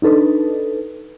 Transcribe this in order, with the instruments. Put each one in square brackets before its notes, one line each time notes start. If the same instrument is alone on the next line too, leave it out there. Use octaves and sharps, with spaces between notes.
[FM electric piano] D4 D#4 A4 B4